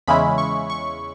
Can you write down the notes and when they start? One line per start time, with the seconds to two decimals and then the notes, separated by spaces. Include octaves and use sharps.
0.07 E2 C#3 G#3 C#4 E4 B5
0.38 C#6
0.70 C#6